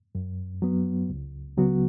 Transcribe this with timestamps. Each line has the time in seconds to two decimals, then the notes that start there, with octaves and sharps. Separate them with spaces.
0.15 F#2
0.62 F#3 B3
1.09 C#2
1.57 C#3 F#3 B3 F#4